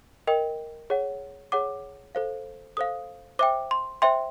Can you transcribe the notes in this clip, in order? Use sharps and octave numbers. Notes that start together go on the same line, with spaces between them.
A#4 D#5 G5
G#4 C#5 F#5
G#4 C#5 F#5 D6
A4 C5 F5
A4 C5 F5 D#6
C5 E5 G5 D6
C6
C5 E5 G5 C6